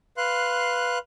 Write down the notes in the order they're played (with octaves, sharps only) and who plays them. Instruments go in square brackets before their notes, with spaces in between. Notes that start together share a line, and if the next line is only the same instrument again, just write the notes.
[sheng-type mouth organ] B4 F5 C6 F#6